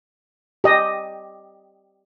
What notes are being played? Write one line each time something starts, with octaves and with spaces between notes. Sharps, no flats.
G4 D#5